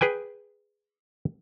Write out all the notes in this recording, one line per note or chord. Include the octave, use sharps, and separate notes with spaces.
G#4 B4 G5 G#5